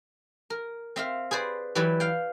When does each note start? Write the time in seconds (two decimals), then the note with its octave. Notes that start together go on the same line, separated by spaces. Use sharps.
0.50 A#4
0.96 C4 E5 F5
1.31 G#4 B4 C5 D5
1.75 E3 F#3 G4 B4 D5
2.00 F5 G5